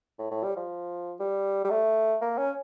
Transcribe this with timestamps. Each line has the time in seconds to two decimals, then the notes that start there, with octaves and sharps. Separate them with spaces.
0.19 A2
0.31 A2
0.44 G3
0.57 F3
1.20 G3
1.64 G3
1.71 A3
2.22 A#3
2.38 C#4